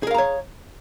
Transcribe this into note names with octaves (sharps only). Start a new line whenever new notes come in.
G#4 A#4 C#5 F5 A#5